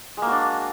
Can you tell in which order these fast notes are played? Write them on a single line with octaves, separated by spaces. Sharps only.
G#3 A#3 F#4 D4